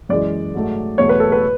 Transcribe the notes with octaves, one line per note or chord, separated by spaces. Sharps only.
F#2 E3 G#3 D5
G#2 F#3 A3
E2 B2 F#3 A3 C#5
B4
A4
B4